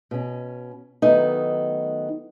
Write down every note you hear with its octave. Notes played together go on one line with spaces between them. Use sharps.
B2 C#4
D#3 F#3 A3 B3 D#4